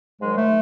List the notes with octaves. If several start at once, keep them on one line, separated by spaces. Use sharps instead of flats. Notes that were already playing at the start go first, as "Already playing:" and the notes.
G#2 D#3 F#3 G#3
A3